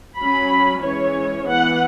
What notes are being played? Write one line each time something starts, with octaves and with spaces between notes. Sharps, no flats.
F#3 C#4 B5
E3 G#3 C#4 C#5
E3 B3 F#5